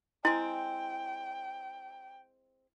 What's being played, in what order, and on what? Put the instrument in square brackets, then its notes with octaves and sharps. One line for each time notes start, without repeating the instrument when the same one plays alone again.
[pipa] G#3 C4 [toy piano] E4 [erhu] G5